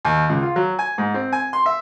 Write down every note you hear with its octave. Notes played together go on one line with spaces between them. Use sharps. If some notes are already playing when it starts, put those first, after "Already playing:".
D#2
C#2
F4
F#3
G#5
G#2
C4
G#5
C6
E5